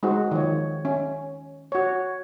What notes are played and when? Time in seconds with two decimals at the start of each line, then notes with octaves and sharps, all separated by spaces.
0.03 G#3 D#4 F#4 C5
0.31 D#3 F3 C#5
0.85 C#4
1.72 F#4 C#5